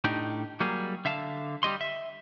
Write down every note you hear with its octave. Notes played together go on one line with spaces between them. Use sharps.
A2 D4 D#4 G4
F#3 G3 A#3 G#4
D3 E5 F5 A5
G3 G4 D#5 C6
E5